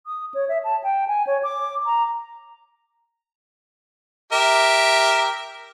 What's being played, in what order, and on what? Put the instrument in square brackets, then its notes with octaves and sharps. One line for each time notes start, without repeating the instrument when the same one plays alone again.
[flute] D#6
C#5
E5
A5
G5
G#5
C#5
D6
A#5
[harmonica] G4 A#4 E5